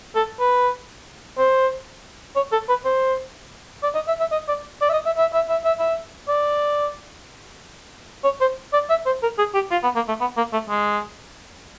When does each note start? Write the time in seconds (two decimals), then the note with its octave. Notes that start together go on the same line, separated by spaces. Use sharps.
0.15 A4
0.40 B4
1.38 C5
2.36 C#5
2.52 A4
2.69 B4
2.85 C5
3.83 D5
3.95 D#5
4.08 E5
4.20 E5
4.32 D#5
4.48 D5
4.81 D5
4.89 E5
4.93 D#5
5.06 E5
5.17 E5
5.33 E5
5.49 E5
5.64 E5
5.79 E5
6.28 D5
8.24 C#5
8.41 C5
8.73 D5
8.90 E5
9.06 C5
9.23 A#4
9.38 G#4
9.54 G4
9.71 F4
9.83 B3
9.96 A#3
10.08 A3
10.20 B3
10.37 A#3
10.53 A3
10.69 G#3